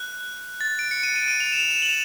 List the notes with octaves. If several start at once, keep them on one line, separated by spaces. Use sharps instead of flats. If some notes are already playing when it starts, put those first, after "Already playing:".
Already playing: F#6
A6
D7
C#7
D#7
D#7
D7
D#7
F7
E7
E7
F#7
F7